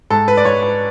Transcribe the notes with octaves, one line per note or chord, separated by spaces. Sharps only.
G#2 A4
B4
D5
G#2 C#5
B4